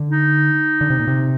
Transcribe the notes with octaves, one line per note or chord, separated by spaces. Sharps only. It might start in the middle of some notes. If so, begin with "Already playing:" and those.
Already playing: D3
D#4
D3
C3
A#2
C3